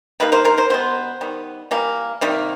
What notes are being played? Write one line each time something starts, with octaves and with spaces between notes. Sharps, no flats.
D#3 G3 A#3 B4
A#4 C5
A#4 C5
A#4 C5
B2 G3 B3 C5
D#3 G3 B3
E3 G3 A#3
C3 D#3 G3 A#3